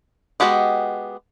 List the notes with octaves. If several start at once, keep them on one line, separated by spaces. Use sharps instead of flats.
G#3 B3 F#4 G4 D#5